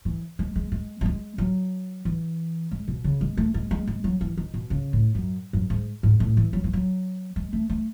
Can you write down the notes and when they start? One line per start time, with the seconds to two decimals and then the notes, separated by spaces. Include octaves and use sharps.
0.05 E3
0.39 G#3
0.56 G#3
0.72 G#3
1.01 F#3
1.06 G#3
1.38 F#3
2.05 E3
2.71 G#3
2.88 B2
3.04 C#3
3.21 G#3
3.37 A3
3.54 G#3
3.71 G#3
3.87 G#3
4.04 F#3
4.21 E3
4.37 D#3
4.54 B2
4.70 C#3
4.93 A2
5.15 F#2
5.53 F#2
5.70 G#2
6.03 G#2
6.20 A2
6.37 E3
6.53 F#3
6.64 E3
6.73 F#3
7.36 G#3
7.53 A3
7.70 A3